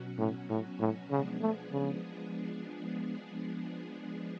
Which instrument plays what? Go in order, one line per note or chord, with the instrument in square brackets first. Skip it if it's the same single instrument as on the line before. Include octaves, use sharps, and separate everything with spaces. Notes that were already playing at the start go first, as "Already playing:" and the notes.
Already playing: [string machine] B2 F#3 C#4 F#4
[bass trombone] A2
A2
A2
[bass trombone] C#3 [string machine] F3 G#3 B3 D4 G#4
[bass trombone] A3
C#3